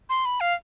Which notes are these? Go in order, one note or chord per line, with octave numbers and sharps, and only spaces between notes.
C6
B5
F5